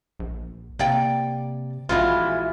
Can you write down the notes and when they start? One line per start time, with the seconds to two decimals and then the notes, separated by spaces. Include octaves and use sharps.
0.19 A#1
0.79 C3 A#3 D5 G5
1.89 A#1 B2 E3 G#3 E4 F4